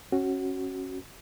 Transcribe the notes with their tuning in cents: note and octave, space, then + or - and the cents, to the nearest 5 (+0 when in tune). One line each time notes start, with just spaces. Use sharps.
C#4 -20 F#4 +10